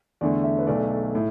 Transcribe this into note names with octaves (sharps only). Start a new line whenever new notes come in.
E2 D3 A3 D5
E5
B4
B1 B2 A3 D5
A2